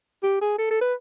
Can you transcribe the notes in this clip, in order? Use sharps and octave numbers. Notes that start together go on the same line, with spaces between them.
G4
G#4
A4
A4
B4